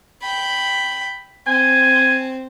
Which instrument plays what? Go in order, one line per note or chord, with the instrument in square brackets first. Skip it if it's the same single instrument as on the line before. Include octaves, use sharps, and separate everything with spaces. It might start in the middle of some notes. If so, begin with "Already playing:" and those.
[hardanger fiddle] G5 B5
[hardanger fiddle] C4 [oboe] G#5